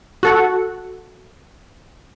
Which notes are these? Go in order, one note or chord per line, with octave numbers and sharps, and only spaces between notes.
F#4 A4 F#5